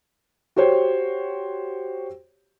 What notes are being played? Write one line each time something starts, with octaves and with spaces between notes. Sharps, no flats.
F#4 G4 C5 C#5